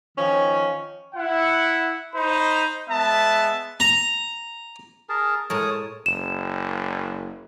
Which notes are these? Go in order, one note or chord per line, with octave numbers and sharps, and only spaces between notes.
D#3 F3 C#4
E4 F#5
D#4 C5 B5
G#3 B3 E5 A5
A#5
G#4 A#4 A5
A2 G#3 A#4 C#5 A5 D#6
F#1 E7